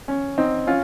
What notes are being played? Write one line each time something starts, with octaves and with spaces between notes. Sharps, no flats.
C#4
C4 D#4
C#4 F4